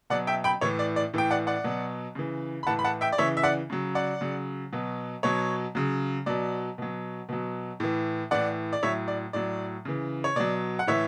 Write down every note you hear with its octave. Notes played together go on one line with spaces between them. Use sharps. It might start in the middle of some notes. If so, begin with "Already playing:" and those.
B2 F#3 D5 F#5
E5 G5
G5 B5
A2 E3 C#5
D5
D5
A2 E3 G5
D5 F#5
D5 F#5
B2 F#3
C#3 E3
B5
A2 E3 F#5 A5
B5
F#5 A5
E5 G5
D5
C#3 E3 C#5 E5
E5
D5 F#5
C#3 F#3
D5 F#5
C#3 F#3
B2 F#3
B2 F#3 C#5
C#3 F#3
B2 F#3 D5
B2 F#3
B2 F#3
A2 E3
A2 E3 D5 F#5
D5
A2 F#3 C#5 E5
D5
A2 F#3 D5
C#3 E3
C#5
B2 F#3 D5
F#5
A2 E3 C#5 E5